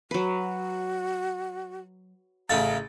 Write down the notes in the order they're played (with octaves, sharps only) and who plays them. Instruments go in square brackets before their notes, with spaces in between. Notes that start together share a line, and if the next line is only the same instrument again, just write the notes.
[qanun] F#3 B4 [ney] F#4
[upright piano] A1 A3 A6 [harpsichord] C#3 E4 F5 [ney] A#5